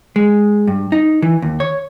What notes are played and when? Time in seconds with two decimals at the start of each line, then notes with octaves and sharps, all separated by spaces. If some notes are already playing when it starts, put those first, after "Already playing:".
0.16 G#3
0.67 G2
0.92 D#4
1.22 E3
1.42 D#2
1.60 C#5